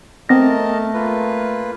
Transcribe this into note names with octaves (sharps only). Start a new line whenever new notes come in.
A3 B3 C4 A#4 D#5 A5 A#6
A#3 F4 B4